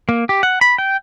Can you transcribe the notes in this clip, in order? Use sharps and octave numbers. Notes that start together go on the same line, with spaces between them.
A#3
G4
F#5
B5
G5